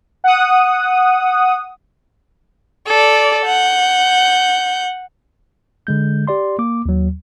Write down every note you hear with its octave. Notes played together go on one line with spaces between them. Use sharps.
F#5 D#6
A4 D5
F#5 G6
D3 G#3 G6
G4 D5 C6
A#3 D6
D#2 F#3